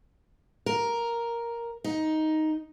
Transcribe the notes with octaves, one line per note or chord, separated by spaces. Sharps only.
A#4
D#4